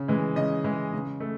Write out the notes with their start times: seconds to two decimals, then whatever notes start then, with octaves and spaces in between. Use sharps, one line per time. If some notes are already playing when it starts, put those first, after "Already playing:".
Already playing: C#3
0.08 E3 G#3
0.36 C#3 D#5
0.64 E3 G#3
0.93 C#3
1.20 A3